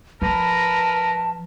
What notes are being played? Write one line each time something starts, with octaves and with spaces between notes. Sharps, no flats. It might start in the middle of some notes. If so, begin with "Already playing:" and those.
F3 A#4 B4 A5 A#5